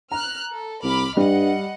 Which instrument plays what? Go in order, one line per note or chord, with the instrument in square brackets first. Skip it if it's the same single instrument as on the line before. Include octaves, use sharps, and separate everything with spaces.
[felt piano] A#5 [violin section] F6 F#6
[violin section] A4
[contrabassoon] C2 [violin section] B5 D6 F6
[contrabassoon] G2 [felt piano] G3 [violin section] D#5 F#5